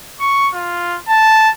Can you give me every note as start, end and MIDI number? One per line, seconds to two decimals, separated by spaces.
0.20 0.49 85
0.54 0.98 65
1.08 1.49 81